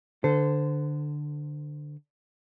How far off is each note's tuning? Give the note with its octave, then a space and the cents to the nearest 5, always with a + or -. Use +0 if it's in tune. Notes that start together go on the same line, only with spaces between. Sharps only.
D3 +10 A4 +0 C5 -25